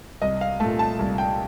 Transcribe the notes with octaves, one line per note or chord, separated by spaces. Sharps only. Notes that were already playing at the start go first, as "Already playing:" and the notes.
C2 D#5
F5
A#2 A3 A5
A5
C2
G5